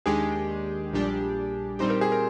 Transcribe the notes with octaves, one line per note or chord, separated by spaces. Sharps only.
D#2 D#3 G#3 D4 G4 G#4
A#1 A#2 G3 D4 G4
A#2 G3 C4 D#4 G4 C5
A#4
G#4
A#4